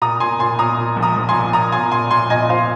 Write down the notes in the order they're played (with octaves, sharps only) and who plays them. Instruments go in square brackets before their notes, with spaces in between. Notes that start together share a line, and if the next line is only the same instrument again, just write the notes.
[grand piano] A#2 A#5 D#6
A#2 G#5 C6
A#2 G#5 C6
A#2 A#5 D#6
A#2
A#1
A#5 D#6
A#1
G#5 C6
A#2
A#2 A#5 D#6
A#2 G#5 C6
A#2 G#5 C6
A#2 G#5 C6
A#2 D#5 G#5
A#2 C5 F5